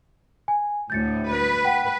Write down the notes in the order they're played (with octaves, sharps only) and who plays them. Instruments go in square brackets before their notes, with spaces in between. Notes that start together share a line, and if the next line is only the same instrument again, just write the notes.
[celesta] G#5
[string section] D2 A2 [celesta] G6 A6 C#7
[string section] B4
[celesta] F#5 G5